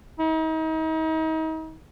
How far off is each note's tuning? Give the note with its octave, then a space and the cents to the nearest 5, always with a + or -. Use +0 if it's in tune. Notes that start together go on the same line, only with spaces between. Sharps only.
D#4 +35